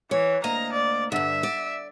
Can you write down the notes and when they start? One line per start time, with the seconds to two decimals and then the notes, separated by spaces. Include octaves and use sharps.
0.11 E3 C#5
0.44 D2 A#3 D#5 A#5
0.73 D5
1.12 G2 D3 E5
1.43 D5